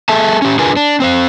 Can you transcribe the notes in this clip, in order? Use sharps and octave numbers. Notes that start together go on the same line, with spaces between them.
G#4 A4 E5 A5
C#4 G4
D4 F4 G#4 A#4 B4 G#5
D4
C4 C5 F5